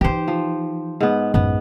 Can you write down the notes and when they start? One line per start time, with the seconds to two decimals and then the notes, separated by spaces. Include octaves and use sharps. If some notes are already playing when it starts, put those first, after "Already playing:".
0.01 E3 D#4 G4 C5
0.28 F3
1.01 G#2 B3
1.34 A1 F#2 B3